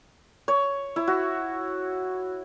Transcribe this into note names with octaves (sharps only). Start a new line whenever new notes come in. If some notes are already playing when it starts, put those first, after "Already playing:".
C#5
E4
F#4